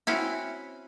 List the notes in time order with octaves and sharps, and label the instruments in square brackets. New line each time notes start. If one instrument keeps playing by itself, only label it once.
[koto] C4 C#4 E4 F#4